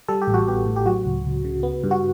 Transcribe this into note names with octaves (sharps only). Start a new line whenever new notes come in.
G3 A4
G4
A1
F#4
B3 G4
A2
G4
F#3 F#4
C#2
C#2
C#3
B3
G2
F#4